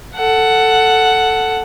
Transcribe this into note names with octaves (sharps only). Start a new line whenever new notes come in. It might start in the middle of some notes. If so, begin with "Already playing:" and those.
A4 F#5